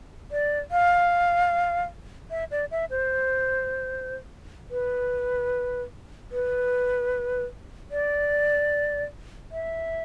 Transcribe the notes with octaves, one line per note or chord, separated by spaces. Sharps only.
D5
F5
E5
D5
E5
C5
B4
B4
D5
E5